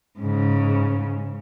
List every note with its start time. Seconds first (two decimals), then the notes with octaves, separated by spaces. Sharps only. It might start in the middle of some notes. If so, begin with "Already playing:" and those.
0.19 G#2 C#3